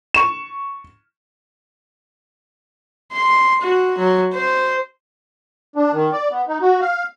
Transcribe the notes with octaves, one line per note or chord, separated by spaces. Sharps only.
C#6 E7
C6
F#4
F#3
C5
D4
D#3
D5
B3
D#4
F#4
F5